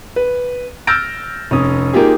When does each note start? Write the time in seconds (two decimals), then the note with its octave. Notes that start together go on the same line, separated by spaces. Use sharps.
0.16 B4
0.87 E6 F6 G6 A6 A#6 D7
1.51 F1 C#4 D#6
1.93 A#3 D#4 F4 G4 G#4